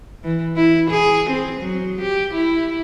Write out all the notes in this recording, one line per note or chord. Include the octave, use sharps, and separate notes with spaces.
E3
E4
G#4
C4
F#3
G4
E4